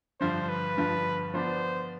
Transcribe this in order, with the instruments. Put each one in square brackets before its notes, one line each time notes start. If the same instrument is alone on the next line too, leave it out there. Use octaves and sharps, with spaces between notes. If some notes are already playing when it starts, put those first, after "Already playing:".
[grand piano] G2 D3 F3 [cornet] C5
[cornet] B4
[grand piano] G2 D3 F3
[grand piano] F3 B3 D4 [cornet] C5